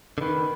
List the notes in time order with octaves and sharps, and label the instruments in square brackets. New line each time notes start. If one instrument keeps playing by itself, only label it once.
[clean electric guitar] D3
[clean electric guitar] D#3 [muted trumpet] B4